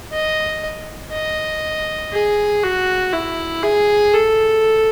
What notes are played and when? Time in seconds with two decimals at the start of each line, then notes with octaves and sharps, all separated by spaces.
0.12 D#5
1.13 D#5
2.12 G#4
2.63 F#4
3.13 E4
3.63 G#4
4.14 A4